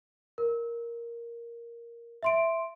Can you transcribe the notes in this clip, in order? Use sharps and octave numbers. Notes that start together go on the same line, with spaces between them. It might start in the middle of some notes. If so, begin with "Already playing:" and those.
A#4
E5 C6 D7